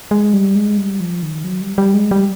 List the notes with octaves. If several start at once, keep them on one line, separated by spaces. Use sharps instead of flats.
G#3
G3
G#3
G3
F3
D#3
F#3
G3
G3
G#3
G3